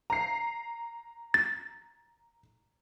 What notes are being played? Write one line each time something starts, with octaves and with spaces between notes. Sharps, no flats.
A#5 C7
A6